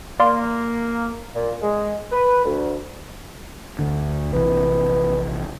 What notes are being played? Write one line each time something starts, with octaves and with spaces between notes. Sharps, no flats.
A#3 D5 F5 C6
A#2
G#3
B4
D2
D2 D3
A#1 C3 E3 B3